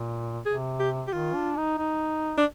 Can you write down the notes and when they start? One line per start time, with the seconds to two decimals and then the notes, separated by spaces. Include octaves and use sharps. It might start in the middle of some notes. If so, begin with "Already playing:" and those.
Already playing: A#2
0.46 C3 G#4
0.80 G4
1.07 G4
1.13 D#3 F4
1.35 D4
1.57 D#4
1.78 D#4
2.38 D4